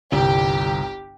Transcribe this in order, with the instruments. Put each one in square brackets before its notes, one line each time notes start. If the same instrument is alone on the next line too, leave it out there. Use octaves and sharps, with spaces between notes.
[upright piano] G1 C2 [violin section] G4